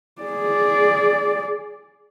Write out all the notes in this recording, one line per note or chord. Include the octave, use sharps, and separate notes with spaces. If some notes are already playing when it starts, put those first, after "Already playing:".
G#4 D5